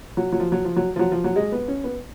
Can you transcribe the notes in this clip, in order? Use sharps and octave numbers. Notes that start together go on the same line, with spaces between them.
F#3
F#3
F3
F#3
F3
F#3
F3
F#3
F3
F#3
G#3
B3
C#4
B3